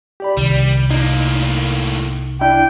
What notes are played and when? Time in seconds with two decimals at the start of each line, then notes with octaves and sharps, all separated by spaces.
0.20 G4 D5 B5
0.37 C2 D#3 G3
0.91 A2 A#3 D#4
2.41 D4 E4 G5